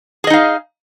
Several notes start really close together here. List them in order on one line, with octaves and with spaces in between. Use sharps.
G#4 D#5 D#4 F5